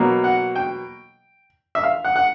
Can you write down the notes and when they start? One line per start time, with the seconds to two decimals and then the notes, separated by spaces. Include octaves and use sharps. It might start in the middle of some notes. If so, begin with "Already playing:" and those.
Already playing: B2 F#3 A#3
0.24 F#5
0.56 G5
1.75 E5
1.84 F5
2.05 F#5
2.16 F#5